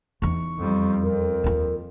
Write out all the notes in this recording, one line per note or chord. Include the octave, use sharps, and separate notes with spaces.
E2 D#4 C#6
F2 G3
F2 A#4
D#2 F4